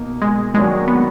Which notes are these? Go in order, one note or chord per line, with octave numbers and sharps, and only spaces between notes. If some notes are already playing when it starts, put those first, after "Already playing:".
Already playing: B2 A#3 D#4
G#3
D#3 F#3 G#3 A#3 D4
B3